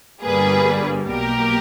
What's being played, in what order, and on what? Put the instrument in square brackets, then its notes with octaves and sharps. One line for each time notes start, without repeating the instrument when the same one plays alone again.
[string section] G1 G2 G3 A#3 G#4 B4
B1 B2 A#3 G4 A#4